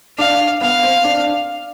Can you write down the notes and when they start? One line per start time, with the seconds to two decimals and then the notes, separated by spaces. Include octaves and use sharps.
0.18 D4 F5
0.61 B3 F5
0.83 C4
1.04 D4